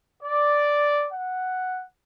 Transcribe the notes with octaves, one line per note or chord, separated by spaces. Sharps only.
D5
F#5